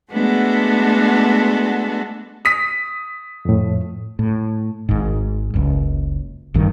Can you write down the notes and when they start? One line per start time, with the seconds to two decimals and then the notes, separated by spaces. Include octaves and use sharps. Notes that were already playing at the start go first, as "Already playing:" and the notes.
0.11 G#3 A3 B3 D4 F#4 A4
2.45 D#6 B6
3.45 F2 A2
4.19 A2
4.89 G#1 G#2
5.54 F#1 C#2
6.54 A1 G2 D#3